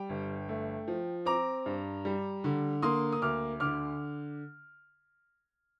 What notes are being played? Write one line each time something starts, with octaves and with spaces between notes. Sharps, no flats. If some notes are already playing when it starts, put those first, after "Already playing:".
Already playing: G3 G5
G1
A3
F3
C4 A#5 D6
G2
G3
D3
A#3 C6 D#6
D#6
D2 D6 F6
D3 D6 F6